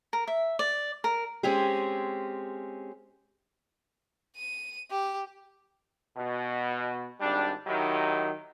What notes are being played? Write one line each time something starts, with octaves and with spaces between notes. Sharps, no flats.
A#4
E5
D5
A#4
G#3 C4 C#4 G4 G#4
D#7
G4
B2
G#1 G3 D4
D#3 F#3 D#4 E4 G4